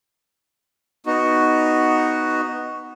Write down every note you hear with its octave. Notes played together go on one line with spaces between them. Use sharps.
B3 D#4 F#4